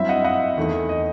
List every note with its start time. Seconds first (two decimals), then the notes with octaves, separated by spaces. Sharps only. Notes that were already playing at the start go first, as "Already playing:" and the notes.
Already playing: G2 F#3 C4 E4 E5
0.09 D#5 F#5
0.24 D#5 F#5
0.57 E2 D#3 A3 E4
0.89 D#5